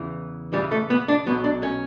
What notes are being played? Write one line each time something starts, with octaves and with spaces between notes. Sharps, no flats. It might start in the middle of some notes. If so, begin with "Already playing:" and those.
Already playing: E2 C#3 E3
E2 C#3 E3 G3
A3
B3
D4
B1 B2 F#3 B3
D4
C#4